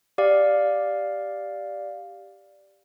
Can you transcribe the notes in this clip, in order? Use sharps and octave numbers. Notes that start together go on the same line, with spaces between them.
G4 D5 F5